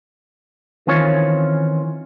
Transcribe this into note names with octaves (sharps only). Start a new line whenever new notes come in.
D#3 E3 C4 C#4 F4 C#5